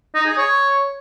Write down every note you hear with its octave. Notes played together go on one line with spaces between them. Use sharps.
D#4
G#4
C#5